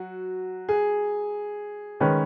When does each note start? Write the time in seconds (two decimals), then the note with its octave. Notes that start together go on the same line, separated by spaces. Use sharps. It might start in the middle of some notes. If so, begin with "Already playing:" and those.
Already playing: F#3 F#4
0.69 G#4
2.00 D#3 G#3 C#4 B4